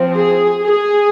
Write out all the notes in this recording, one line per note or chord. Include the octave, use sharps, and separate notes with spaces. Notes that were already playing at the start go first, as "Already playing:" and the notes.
Already playing: F3 C4
G#4
G#4